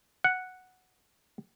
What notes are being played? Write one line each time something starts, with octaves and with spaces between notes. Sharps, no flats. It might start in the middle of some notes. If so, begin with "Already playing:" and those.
F#5